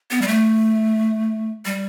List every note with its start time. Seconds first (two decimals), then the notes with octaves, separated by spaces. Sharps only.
0.11 B3
0.22 G3
0.28 A3
1.65 G3